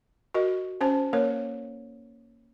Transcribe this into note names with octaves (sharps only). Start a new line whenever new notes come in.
F#4 A#4 D#5
C#4 C5 A5
A#3 A#4 C#5